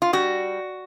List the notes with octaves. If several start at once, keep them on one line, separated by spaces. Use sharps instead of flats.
F4
G3 F#4